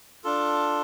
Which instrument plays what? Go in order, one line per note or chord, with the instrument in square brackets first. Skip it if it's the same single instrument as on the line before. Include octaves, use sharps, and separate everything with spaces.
[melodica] D4 F4 A4